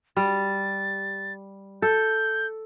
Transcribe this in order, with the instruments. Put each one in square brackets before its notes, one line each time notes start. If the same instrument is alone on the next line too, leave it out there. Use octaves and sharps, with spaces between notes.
[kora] G3 [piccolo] A6
[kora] A4 [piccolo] G6